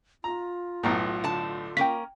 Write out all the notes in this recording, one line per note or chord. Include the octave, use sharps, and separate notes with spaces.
F4 A#5
B1 A2 B3 A#5
D3 A5
A#3 C#4 A#4 G5 B6